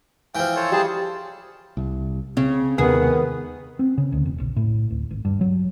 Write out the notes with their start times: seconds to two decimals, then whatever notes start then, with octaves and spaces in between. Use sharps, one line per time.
0.35 E3 F3 G5
0.56 A4 C5 C#5
0.72 G3 G#4 C5 A5
1.77 C2
2.37 C#3 C4
2.78 D#2 C3 D#3 B3 G#4
3.79 C4
3.98 C#3
4.12 D2
4.25 E1
4.40 A#1
4.56 A2
4.90 D1
5.11 G#1
5.25 G2
5.41 F#3